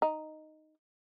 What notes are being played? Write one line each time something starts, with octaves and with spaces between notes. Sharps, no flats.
D#4